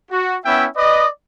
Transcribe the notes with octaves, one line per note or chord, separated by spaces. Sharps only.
F#4
B3 C#4 E4 E5 G5
B4 D5 D#5